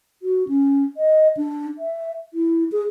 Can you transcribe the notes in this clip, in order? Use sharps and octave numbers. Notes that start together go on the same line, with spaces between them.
F#4
C#4
D#5
D4
E5
E4
G#4